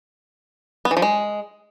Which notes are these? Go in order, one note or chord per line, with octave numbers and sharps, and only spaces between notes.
B3
E3
F3
G#3